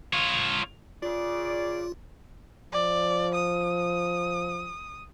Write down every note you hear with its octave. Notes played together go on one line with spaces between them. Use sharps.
F4 C#5
C#3 F4 D5
F3 D5
D#6